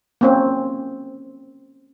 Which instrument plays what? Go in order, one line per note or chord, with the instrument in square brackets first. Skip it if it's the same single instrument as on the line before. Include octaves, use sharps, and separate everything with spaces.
[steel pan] A#3 C4 C#4